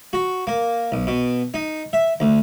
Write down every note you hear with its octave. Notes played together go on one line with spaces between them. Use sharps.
F#4
A#3
B1
B2
D#4
E5
D2